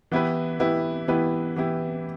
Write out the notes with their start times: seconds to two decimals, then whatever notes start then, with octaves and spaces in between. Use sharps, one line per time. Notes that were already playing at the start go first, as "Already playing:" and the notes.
0.12 E3 B3 E4 G4 B4
0.60 E3 B3 E4 G4 B4
1.08 E3 B3 E4 G4 B4
1.56 E3 B3 E4 G4